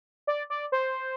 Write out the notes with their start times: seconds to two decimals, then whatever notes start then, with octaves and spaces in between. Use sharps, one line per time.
0.27 D5
0.50 D5
0.72 C5